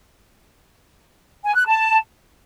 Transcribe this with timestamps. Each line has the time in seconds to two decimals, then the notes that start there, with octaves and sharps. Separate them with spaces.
1.45 G#5
1.56 F#6
1.66 A5